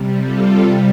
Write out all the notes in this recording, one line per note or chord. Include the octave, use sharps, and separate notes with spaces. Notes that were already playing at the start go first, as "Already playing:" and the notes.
Already playing: C3 G3
F4 A4